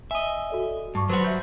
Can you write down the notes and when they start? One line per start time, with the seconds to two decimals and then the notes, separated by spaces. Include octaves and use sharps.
0.11 D#5 E5 G#5
0.50 F#4 A4 D5
0.95 G2 A5 C#6
1.09 F#3 G3 F#4 B4 C5 C6
1.24 E5 G6